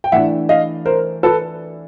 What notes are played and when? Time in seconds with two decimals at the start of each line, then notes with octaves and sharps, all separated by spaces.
0.04 G5
0.12 E3 A3 D4 E5 F#5
0.49 D#5 F5
0.86 A#4 C5
1.23 A4 B4